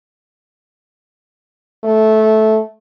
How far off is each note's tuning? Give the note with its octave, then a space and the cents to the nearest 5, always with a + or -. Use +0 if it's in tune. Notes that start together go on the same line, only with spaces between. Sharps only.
A3 -15